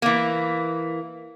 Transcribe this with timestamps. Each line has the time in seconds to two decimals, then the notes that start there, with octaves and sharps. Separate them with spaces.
0.02 E3 A#3